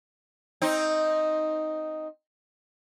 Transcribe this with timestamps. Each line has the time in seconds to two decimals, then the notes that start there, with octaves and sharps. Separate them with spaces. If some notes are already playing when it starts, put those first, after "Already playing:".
0.62 C4 D#4